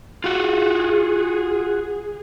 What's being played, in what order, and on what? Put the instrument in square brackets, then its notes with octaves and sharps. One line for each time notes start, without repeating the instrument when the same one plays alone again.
[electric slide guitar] F4 F#4 [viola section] G#4